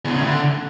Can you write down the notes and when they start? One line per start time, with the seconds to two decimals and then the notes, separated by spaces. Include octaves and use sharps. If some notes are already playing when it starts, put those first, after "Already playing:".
0.05 E2
0.10 D3
0.15 C#3
0.20 A2
0.25 D3